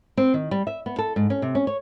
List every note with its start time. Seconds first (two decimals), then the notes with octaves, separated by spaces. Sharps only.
0.17 C4
0.34 D#3
0.51 G3
0.67 E5
0.86 B3
0.99 A4
1.16 G#2
1.30 C#4
1.42 C3
1.55 C#4
1.67 C#5